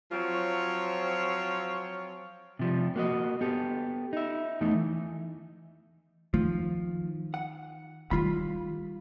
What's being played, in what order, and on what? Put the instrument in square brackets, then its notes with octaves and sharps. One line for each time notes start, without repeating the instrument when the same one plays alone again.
[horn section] F3 F#3 C4 F4 C#5
[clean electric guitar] C3 F3 G3
A#3 F#4 D#5
B3 G4 A4
D#4 E5
E2 A3 D#4
E3
[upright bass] D#3 [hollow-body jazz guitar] F3
[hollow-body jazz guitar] F#5
[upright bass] D#3 G3 [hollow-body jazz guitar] F4 B5